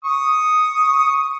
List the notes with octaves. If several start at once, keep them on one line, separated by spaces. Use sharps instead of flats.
C#6 D#6